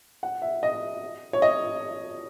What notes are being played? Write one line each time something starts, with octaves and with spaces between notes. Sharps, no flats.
F#5
E5
D#5
C#5
D#5